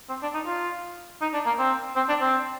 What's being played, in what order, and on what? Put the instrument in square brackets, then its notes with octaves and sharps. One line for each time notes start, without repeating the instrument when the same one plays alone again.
[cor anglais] C4
D4
D#4
F4
D#4
D4
A#3
C4
C4
D4
C4